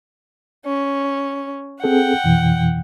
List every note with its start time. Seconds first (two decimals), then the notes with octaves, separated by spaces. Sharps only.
0.65 C#4
1.84 C4 G#4 A4 F#5 G5
2.24 F2 B2 E3